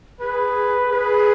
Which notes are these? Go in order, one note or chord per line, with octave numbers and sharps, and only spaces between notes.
G#4 B4
G#4 B4